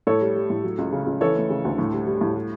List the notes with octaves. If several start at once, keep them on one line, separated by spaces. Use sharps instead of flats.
A2 A4 C#5
G3
G3
A2
F#3
C#2
C#3
C#2
E3 A4 C#5
A3
C#3
D2
A2
G3
G3
A2
G3